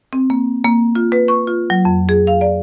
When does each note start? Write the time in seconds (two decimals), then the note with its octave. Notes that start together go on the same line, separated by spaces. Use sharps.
0.13 C4
0.30 A#3
0.65 A#3
0.95 F4
1.12 B4
1.28 C#6
1.47 F4
1.70 F#3
1.85 F2
2.09 G#4
2.27 F5
2.41 D5